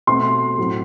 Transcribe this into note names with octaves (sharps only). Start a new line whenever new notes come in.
B2 A3 C4 C6
A2 F#3 C4